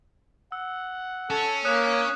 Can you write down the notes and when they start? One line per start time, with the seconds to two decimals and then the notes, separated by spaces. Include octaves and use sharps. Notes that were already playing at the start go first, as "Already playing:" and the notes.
0.52 F#5 E6
1.30 C#4 A4 E7
1.65 A#3 C#5 D#6 F#6 E7